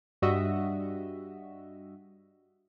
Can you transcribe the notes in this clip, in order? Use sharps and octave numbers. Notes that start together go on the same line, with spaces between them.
G2 G3 F#4 D#5 E5